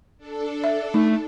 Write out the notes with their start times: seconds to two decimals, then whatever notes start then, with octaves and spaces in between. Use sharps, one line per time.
0.18 D4 A4
0.64 E5
0.94 A3 D#4